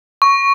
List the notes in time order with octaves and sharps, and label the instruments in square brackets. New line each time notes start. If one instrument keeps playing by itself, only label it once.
[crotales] C#6